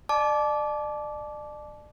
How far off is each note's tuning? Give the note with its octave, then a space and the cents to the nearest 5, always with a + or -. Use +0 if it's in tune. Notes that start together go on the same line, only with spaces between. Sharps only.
D5 +35 A5 -30 D6 -10